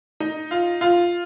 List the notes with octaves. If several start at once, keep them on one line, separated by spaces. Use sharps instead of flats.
D#4
F4
F4